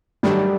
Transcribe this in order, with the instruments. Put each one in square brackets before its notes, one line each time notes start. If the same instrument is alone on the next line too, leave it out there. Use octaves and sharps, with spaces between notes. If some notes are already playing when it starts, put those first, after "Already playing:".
[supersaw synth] G#2 D#3 F#3 A3 D4 [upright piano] G3